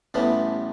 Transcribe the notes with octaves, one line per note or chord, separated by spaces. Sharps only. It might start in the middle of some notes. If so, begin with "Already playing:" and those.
A1 A2 E3 G3 B3